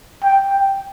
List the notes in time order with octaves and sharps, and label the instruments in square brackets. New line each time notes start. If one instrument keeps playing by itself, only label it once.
[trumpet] G5